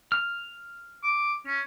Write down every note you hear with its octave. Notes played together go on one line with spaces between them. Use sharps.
F6
D6
C#4